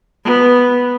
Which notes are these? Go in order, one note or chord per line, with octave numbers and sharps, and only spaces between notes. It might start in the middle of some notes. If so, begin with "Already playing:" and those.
B3